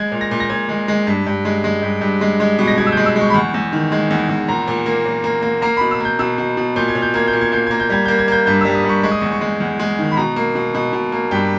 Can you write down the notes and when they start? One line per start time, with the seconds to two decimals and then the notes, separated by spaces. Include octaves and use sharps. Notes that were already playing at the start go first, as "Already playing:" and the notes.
Already playing: G#3 G#6
0.12 A#2
0.21 A#6
0.31 A#2
0.40 A#6
0.50 A#2 G#6
0.69 G#3
0.88 G#3
1.07 G2
1.27 G2
1.45 G#3
1.64 G#3
1.83 G2
2.02 G2
2.21 G#3
2.40 G#3
2.59 B2
2.68 A#6
2.77 B2 G#6
2.86 E6
2.92 G#3 G6
3.06 E6
3.16 G#3 C#6
3.30 B5
3.34 E2 C#6
3.54 E2
3.73 D#3
3.92 G#3
4.11 E2
4.29 E2
4.48 A#2 A#5
4.68 A#2
4.86 A#3
5.05 A#2
5.24 A#3
5.43 A#3
5.62 A#3 A#5
5.77 B2 B5
5.91 E6
6.00 A#3 G6
6.19 B2 E6
6.38 B2
6.57 B2
6.76 A#2 G6
6.88 G#6
6.95 A#2
7.02 G6
7.14 A#3 G#6
7.27 G6
7.33 A#2
7.41 G#6
7.52 A#3 G6
7.67 A#3 G#6
7.80 G6
7.90 G3 G#6
8.06 A#3 G6
8.19 G#6
8.28 A#3 G6
8.46 G2 G6
8.61 G3 E6
8.75 D#6
8.84 G2 C#6
9.03 G#3 C#6
9.12 D#6
9.20 E2 C#6
9.32 C#6
9.41 G#3
9.60 E2
9.79 G#3
9.99 D#3
10.11 B5
10.17 B2 A#5
10.36 A#3
10.55 B2
10.74 B2
10.93 B2
11.12 A#3
11.31 G2 G5